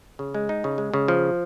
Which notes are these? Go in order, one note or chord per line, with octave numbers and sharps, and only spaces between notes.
C#3
G#3
D#4
C#3
G#3
C#3
F3